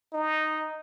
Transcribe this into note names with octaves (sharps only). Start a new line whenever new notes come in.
D#4